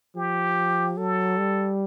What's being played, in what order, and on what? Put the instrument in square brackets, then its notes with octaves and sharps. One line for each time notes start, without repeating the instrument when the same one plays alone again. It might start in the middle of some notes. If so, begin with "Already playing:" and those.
[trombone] F3 [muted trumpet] G4
[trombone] F#3 [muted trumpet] A4
[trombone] G3